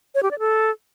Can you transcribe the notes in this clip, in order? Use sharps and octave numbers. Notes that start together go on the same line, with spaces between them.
C#5
G4
D5
A4